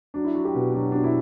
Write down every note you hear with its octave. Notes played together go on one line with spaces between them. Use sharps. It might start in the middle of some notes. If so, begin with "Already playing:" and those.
F#3 D4
E4
F#3 F#4
G4
B2
F#3 D4
B2 D4
E4